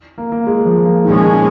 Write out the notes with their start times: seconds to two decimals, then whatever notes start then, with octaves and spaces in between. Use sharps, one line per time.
0.18 A#3
0.32 A#3
0.47 G#3
0.66 F3
0.85 A#3
1.04 A#2 D#3 F3 G#3 C#4
1.28 C#3
1.33 D#3